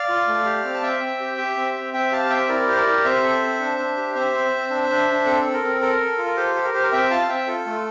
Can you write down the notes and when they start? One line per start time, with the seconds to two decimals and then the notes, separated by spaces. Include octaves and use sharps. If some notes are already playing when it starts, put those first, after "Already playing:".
Already playing: D5 F5
0.09 F4
0.28 A3
0.45 G4
0.64 C4
0.74 A5
0.83 C4 E5 G5
1.01 C4
1.20 G4
1.38 G4
1.57 C4
1.76 C4
1.93 C4 E5 G5
2.11 G4 F5 A5
2.30 C4 E5 G5
2.49 E4 A#4 D5
2.67 G4 C5
2.77 A#4 D5
2.86 G4
3.05 C4 C5 E5
3.23 A4
3.42 C4
3.60 D4
3.78 D4
3.97 G4
4.15 C4 C5 E5
4.34 C4
4.52 C4
4.70 D4
4.90 D4
5.08 D4
5.26 C4 A4
5.44 A4
5.54 A#4
5.62 C4
5.81 A4 A#4
6.00 A4
6.18 F4
6.25 A#4
6.36 G4 A4 C5
6.55 G4
6.64 A#4
6.74 G4 C5
6.83 A#4
6.92 C4 E5 G5
7.11 F4 F5 A5
7.29 C4 E5 G5
7.47 F4 A4
7.66 A3